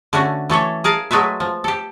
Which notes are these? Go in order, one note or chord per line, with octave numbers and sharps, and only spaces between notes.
D3 A3 C#4 F#4
E3 A3 A4 C#5
G#4 A#4 F5 A5
F#3 G#3 A3 B4 E5
F3
G4 A4